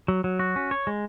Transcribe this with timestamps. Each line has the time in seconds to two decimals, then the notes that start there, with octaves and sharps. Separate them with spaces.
0.08 F#3
0.24 F#3
0.39 F#4
0.56 C#4
0.71 C#5
0.87 G#3